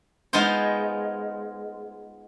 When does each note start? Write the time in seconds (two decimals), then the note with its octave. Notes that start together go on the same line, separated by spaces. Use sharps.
0.33 G#3 B3 D#4 F4 C5